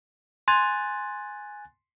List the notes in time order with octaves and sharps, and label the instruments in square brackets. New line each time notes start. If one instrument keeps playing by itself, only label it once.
[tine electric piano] G#5 F#6 A6 [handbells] C6